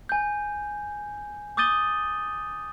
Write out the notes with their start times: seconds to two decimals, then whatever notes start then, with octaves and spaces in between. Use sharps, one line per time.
0.09 G#5 G6
1.57 D6 D#6 G6 A6 D#7 G7